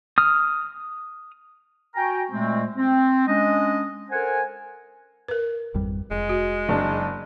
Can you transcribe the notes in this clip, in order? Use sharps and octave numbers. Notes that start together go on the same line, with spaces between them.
D#6 F6
F#4 G5 G#5 A#5
A#2 G#3 A3 C4
C4
G#3 C#4 D4 D#5
A4 A#4 C5 F#5 G#5
A#4 B4
G#1 F2 G3
F1 G#3
F#4
F#1 D4